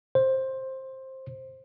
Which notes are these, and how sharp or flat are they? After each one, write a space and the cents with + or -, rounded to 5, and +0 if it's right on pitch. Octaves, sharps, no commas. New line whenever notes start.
C5 +15